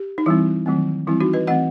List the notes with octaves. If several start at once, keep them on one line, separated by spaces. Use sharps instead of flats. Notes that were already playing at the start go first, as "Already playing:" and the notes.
Already playing: G4
D#4
E3 G3 C4 E4
D#3 F#3 A3 C4
E3 G3 C4 E4
D#4 F#4
B4 D#5
E3 A3 C4 D#5 F#5